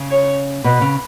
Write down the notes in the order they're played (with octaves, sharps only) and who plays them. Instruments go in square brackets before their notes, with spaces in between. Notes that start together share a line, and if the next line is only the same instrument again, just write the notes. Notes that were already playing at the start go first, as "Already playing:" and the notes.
Already playing: [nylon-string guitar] C#3
[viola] C#5
[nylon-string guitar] B2 [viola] B4
[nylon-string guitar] C#3